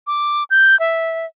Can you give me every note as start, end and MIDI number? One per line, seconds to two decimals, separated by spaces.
0.07 0.44 86
0.50 0.78 91
0.80 1.26 76